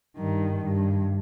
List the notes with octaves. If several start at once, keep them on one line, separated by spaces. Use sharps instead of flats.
G2 D#3
G2